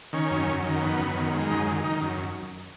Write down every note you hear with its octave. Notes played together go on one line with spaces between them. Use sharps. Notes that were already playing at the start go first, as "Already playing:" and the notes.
D#3 C#4
F#2
F#2
D#3
B3
F#2
D#3
G#3
F#2 D#4
D#3
D#3 D#4
F#2